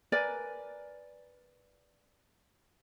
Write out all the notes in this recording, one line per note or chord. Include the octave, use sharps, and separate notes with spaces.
A#4 B4 D5 G#5